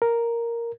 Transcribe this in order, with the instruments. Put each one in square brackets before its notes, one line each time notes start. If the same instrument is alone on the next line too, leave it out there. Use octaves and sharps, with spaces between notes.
[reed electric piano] A#4